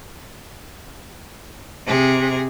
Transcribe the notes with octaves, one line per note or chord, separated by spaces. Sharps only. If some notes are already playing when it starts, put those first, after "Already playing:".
C3 G#4